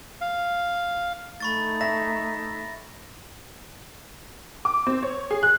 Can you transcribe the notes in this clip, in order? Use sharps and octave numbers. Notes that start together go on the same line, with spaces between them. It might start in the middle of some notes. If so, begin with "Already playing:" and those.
F5
A3 D#4 B5 C#6 A6
E5 A#6
D6
C4
C#5
G#4
F#6